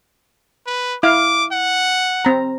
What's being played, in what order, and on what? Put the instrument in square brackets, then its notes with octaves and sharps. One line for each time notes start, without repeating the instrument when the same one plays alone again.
[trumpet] B4
[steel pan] E4 F5 [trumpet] D6
[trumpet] F#5
[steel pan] C4 A#5